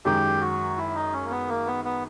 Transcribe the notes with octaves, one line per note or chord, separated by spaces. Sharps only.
F#2 D#3 G#3 G4
F#4
E4
D#4
C#4
A#3
B3
A#3
B3
B3